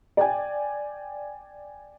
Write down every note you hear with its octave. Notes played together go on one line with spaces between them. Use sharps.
D5 G5 G#5